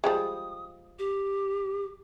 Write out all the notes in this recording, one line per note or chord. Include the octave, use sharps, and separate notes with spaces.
F3 G3 G#3 D#6
G4